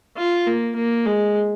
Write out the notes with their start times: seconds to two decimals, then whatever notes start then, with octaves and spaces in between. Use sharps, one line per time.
0.17 F4
0.46 A#3
0.76 A#3
1.05 G#3